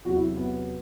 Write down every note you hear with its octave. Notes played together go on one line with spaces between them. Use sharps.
E2 C3 F#3 F#4
E4
B3